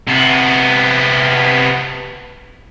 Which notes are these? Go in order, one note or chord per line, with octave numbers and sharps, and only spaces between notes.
C3 B3